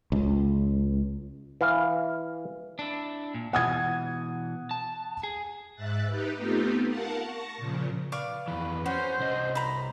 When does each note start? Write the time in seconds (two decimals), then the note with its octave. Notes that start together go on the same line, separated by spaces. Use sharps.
0.12 C#2
1.61 E3 F5
2.79 D4 E4
3.34 A#2
3.53 B2 E3 F#5 D#6 G#6
4.71 A5
5.23 G#4
5.76 G#2 E5 F#6 A6
6.06 D#4 G4 B4
6.38 A3 B3 C4 D#4 F4 G4
6.87 A#4 F5 F#5 A5
7.22 A5 C#6 A#6
7.57 A#2 C#3 F3
8.12 B4 D5 F5 C#6
8.48 F2 E3 B4
8.86 C#4 F#4 C5
9.19 C2 D#5
9.55 C5 A#5 B5